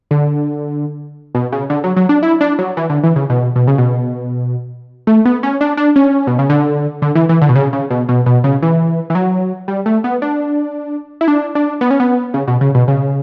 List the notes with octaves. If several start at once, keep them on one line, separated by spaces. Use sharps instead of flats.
D3
B2
C#3
D3
F#3
F#3
D4
E4
D4
F#3
E3
D3
E3
C#3
B2
B2
C#3
B2
A3
B3
C#4
D4
D4
C#4
B2
C#3
D3
D3
E3
E3
D3
B2
C#3
C#3
B2
B2
B2
C#3
E3
E3
F#3
G3
A3
B3
D4
E4
D4
D4
B3
C#4
B3
C#3
B2
C#3
B2
C#3